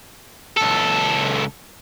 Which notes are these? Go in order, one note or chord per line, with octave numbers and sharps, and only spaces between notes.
C#2 A4